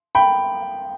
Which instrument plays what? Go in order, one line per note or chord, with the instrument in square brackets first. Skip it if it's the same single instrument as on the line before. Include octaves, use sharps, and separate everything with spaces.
[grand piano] G5 B5